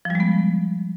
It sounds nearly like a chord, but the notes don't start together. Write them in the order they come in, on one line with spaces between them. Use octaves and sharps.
F3 G3 G#3 B3